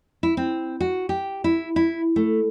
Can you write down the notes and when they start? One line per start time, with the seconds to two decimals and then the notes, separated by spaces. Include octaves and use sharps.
0.23 E4
0.37 C4
0.80 F#4
1.09 G4
1.44 E4
1.76 E4
2.16 A3